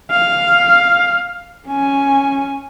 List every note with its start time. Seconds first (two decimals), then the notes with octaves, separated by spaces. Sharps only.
0.11 F5
1.68 C#4 G#5